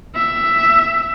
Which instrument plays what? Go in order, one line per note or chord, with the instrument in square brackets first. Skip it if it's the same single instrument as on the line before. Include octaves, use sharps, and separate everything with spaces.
[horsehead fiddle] E5